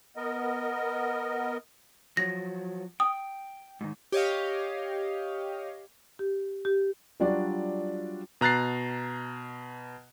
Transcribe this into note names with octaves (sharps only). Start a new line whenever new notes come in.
B3 A#4 D#5
F3 F#3 A#6
G5 D#6
G#2 D#3
G4 C#5 D#5 F5
G4
G4
F#3 G3 D4 F4 F#4 D5
B2 A#5 F#6 A6 C7